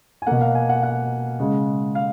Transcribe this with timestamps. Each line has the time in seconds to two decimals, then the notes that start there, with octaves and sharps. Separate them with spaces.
0.22 G#5
0.27 B2 A#3 F#5
0.41 F5
0.55 G#5
0.69 F#5
0.83 F#5
1.40 C#3 G#3
1.95 F5